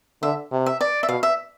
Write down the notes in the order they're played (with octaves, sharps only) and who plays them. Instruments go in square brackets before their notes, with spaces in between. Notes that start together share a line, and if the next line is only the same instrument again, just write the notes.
[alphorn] D3 [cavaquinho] E5
[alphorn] C3
[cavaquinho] E5
D5
E5
[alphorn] B2 [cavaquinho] F5
[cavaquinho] E5